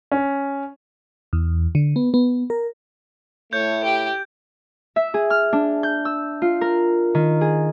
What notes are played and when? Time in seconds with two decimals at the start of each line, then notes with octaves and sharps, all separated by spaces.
0.12 C#4
1.33 E2
1.75 D3
1.96 B3
2.14 B3
2.50 A#4
3.53 A2 A3 C#5 G6
3.84 G4 G5
4.96 E5
5.14 G#4
5.30 F6
5.53 D4
5.83 G6
6.05 E6
6.42 F4
6.61 A#4
7.15 D#3
7.41 G#4